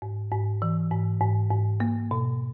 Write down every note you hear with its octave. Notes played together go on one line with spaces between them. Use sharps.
G#2
G#2
E3
G#2
G#2
G#2
A#3
B2